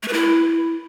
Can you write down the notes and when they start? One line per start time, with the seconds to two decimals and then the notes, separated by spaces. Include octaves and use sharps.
0.03 A3
0.08 B4
0.13 E4